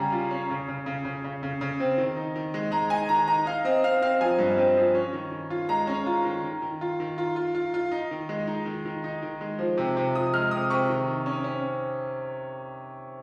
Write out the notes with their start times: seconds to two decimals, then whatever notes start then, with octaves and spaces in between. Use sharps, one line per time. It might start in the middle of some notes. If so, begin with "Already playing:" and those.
Already playing: C#3 G3 C#4 G#5 A#5
0.12 F4
0.31 C#4
0.50 C#3
0.68 C#3
0.86 C#3
1.05 C#3
1.24 C#3
1.43 C#3
1.61 C#3
1.80 C4
1.98 D#3
2.17 D#4
2.36 D#3
2.54 G#3
2.72 G#3 A#5
2.90 D#4 G#5
3.09 D#3 A#5
3.28 D#4 A#5
3.46 D#4 F5
3.65 C4 D#5
3.84 C4 F5
4.02 C4 F5
4.21 F3 G#5
4.39 G2
4.58 C4
4.77 F3
4.95 C#4
5.13 D#3
5.31 D#3
5.50 F4
5.69 G#3 A#5
5.87 C#4
6.06 F4
6.25 D#3
6.44 D#3
6.62 D#3
6.81 F4
7.00 D#3
7.18 F4
7.36 F4
7.55 F4
7.74 F4
7.91 D#4
8.11 D#3
8.29 G#3
8.47 D#4
8.66 D#3
8.85 D#3
9.04 D#4
9.22 D#3
9.41 G#3
9.59 F3
9.78 C3
9.97 C3
10.15 F3 D#6
10.34 G#3 F6
10.51 C3 D#6
10.70 C3 C#6
10.89 D#3
11.08 D#3
11.26 C#4
11.44 C#4